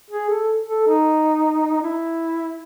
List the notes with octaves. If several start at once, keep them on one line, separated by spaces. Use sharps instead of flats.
G#4
A4
A4
D#4
E4